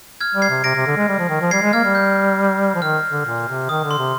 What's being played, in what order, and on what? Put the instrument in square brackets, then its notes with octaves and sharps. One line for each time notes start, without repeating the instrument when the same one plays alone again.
[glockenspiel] F6 G#6
[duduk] G3
[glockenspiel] G#6 C7
[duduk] C3
[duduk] C3 [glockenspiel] A#6 D7
[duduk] C3
D3
G#3
G3
F3
D#3
F3
[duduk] G3 [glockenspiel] G#6 C7
[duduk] G#3
[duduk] A#3 [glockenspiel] F6 G#6
[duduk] G3
[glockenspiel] G6
[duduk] F3
[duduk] D#3 [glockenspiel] F6
[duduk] D3
A#2
C3
[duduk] D#3 [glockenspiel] D#6
[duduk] D3
[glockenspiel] C6
[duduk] C3